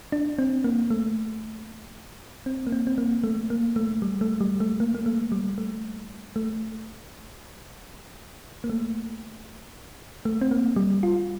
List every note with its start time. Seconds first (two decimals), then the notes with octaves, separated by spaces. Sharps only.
0.12 D4
0.39 C4
0.64 A#3
0.90 A3
2.46 C4
2.67 A#3
2.72 C4
2.87 C4
2.98 A#3
3.24 A3
3.50 A#3
3.76 A3
4.02 G3
4.21 A3
4.41 G3
4.60 A3
4.80 A#3
4.95 A#3
5.06 A3
5.32 G3
5.58 A3
6.36 A3
8.64 A#3
8.70 A3
10.25 A3
10.41 C4
10.51 A#3
10.76 G3
11.03 F4